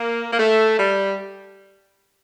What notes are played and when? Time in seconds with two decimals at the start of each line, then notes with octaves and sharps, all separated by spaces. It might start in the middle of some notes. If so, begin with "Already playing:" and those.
Already playing: A#3
0.32 A#3
0.39 A3
0.79 G3